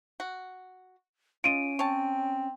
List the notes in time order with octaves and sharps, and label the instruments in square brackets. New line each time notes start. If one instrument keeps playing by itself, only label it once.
[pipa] F#4
[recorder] C#4 [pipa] F4 D#5 [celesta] D7 D#7
[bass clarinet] C4 [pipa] C#5 A5